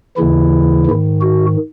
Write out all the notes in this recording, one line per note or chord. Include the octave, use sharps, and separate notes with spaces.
D#2 C#3 E3 E4
G#2 D#3
F#4